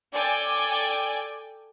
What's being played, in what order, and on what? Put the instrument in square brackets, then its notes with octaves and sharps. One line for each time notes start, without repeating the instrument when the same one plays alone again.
[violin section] A4 D5 G5 G#5